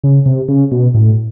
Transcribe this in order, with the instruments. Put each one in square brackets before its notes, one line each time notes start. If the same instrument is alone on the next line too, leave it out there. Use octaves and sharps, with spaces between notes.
[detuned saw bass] C#3
C3
C#3
B2
A2